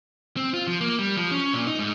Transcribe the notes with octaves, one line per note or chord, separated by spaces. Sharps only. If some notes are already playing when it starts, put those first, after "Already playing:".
C4
F4
F3
A#3
G3
F3
C#4
A#2
D#4
G#2